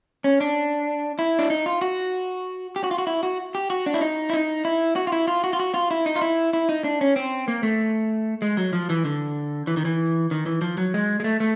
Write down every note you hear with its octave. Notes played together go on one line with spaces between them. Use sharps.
C#4
D4
E4
D4
D#4
F4
F#4
G4
F#4
F4
F#4
E4
F#4
G4
F#4
D4
E4
D#4
E4
D#4
E4
F#4
F4
E4
F4
F#4
F4
F#4
F4
E4
D#4
F4
E4
E4
D#4
D4
C#4
C4
A#3
A3
G#3
F#3
F3
E3
D3
E3
D#3
E3
D#3
E3
F3
F#3
G#3
G#3
A3
A3